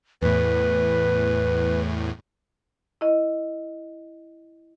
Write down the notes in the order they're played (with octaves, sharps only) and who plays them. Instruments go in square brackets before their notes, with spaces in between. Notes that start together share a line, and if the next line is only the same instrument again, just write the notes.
[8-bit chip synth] E2 A2 [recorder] B4
[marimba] E4 D#5